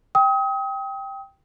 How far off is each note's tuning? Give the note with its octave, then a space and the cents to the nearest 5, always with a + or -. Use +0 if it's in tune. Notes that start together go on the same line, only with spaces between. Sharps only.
G5 +0 D#6 +35